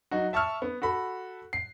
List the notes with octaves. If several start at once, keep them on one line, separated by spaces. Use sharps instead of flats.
F#3 D#4 F#4
E5 A5 C#6 E6 F6
B3
F#4 A4 B5
C7